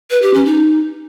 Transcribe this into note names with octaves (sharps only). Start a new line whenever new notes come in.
B4
G4
C#4
D#4